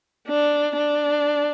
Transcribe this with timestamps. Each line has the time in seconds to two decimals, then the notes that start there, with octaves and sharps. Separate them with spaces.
0.28 D4
0.77 D4